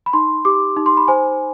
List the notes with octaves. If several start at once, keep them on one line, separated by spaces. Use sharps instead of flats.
B5
D#4 C6
G4 D6
D#4
C6
B5
C5 G#5